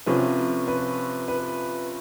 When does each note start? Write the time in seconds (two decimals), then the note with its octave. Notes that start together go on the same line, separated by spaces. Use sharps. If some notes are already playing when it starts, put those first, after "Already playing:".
0.06 C3 F3 A3 C#4 B4
0.68 B4
1.28 B4